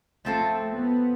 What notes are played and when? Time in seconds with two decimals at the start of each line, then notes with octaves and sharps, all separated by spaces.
0.25 F3 A3 C4 F4 A4
0.75 B3